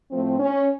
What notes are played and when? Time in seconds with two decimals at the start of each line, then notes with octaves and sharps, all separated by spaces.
0.11 A2 F3 A3 C4
0.40 C#4